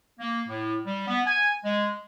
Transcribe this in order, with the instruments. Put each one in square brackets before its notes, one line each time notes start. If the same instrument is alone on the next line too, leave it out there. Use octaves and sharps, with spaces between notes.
[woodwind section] A#3
A2
G3
B3
G#5
G#3